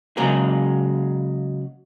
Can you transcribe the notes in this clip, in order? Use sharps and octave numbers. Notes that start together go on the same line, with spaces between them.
C#3 F#3 G#3 A#3 G#4